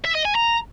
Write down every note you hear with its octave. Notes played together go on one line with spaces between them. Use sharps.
E5
D#5
G#5
A#5